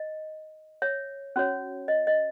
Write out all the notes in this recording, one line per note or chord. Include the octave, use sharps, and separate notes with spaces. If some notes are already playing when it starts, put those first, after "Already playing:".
Already playing: D#5
C#5 E5
C#4 F#4 C#5
D#5
D#5